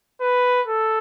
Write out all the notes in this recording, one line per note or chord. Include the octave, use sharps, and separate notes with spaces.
B4
A4